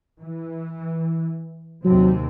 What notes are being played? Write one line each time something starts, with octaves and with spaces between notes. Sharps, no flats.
E3
D#2 C3 F#3 C4